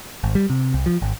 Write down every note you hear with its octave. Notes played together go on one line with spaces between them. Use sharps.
G#1
G3
C3
C2
F3
G#1